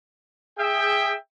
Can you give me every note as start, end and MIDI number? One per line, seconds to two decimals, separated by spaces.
0.58 1.14 68
0.58 1.14 76
0.58 1.14 79